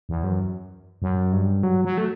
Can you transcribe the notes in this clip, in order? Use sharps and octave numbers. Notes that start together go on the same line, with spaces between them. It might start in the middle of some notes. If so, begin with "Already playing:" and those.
E2
F#2
F#2
G2
F#3
F#3
A3